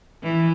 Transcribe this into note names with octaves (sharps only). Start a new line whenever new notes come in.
E3